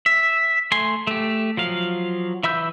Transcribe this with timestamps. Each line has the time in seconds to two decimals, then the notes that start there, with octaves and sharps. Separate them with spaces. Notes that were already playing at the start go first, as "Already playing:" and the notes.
0.06 E5
0.72 A3 G#5 C6
1.07 A3 G4
1.57 F3 F#3 F5
2.43 E3 E5 B5 E6 G6